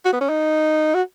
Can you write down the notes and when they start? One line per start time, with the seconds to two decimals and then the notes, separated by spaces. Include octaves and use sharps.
0.05 F#4
0.13 B3
0.21 C#4
0.29 D#4
0.94 F#4